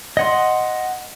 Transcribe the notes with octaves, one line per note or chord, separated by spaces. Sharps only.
D#5 F#5 C6